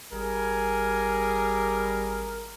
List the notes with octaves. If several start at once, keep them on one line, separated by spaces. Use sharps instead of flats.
G#1 G3 G#4 A#4